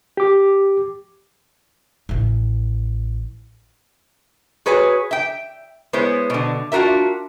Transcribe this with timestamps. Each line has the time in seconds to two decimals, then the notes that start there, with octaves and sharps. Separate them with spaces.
0.17 G4 D6
2.09 A1 E3
4.66 F#4 G#4 B4 C#5 G#5
5.11 E5 G5
5.93 G#3 B3 E4 C5 C#5
6.30 B2 D3
6.72 D4 F4 F#4 A#4 E5